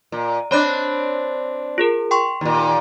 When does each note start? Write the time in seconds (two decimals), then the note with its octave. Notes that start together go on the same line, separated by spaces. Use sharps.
0.12 A#2
0.51 C4 D4 C#5 B5 F#6
1.78 F4 G#4 A#4
2.11 G5 C6 C#6
2.41 D#2 A#2